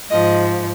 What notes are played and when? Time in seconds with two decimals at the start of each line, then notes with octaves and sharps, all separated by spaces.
0.10 G#2 F3 D#5